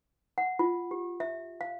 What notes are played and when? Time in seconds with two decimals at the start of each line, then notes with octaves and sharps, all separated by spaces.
0.38 F#5
0.59 F4
0.91 G4
1.20 E5
1.61 F5